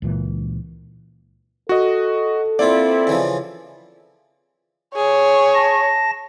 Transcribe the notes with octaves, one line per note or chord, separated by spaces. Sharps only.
C#2 A#2 E3
F#4 A4 D#5
A#3 C4 E4 F4 D5
C#3 E3 F3
G#4 C#5
A5 A#6